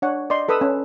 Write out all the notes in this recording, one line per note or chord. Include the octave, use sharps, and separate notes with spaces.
D4 C#5 F#5
D5 D#5 C6
A4 B4 B5 D#6 E6
C#4